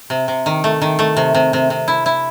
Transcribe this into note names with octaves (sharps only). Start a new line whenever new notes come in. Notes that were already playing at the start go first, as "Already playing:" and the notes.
C3
C3
D#3
A3
D#3
A3
C3
C3
C3
C3
E4
E4